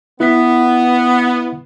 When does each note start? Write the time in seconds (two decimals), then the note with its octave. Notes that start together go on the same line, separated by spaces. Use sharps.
0.20 B3 E4 B6